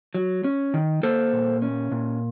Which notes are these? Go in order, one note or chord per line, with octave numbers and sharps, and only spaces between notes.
F#3
C#4
D#3
A#3 A4 C5
A#2
C#4
A#2